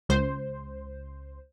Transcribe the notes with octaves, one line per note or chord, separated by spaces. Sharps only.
C#2 C5